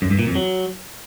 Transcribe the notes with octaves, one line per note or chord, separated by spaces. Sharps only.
F#2
G2
A#2
F2
F#3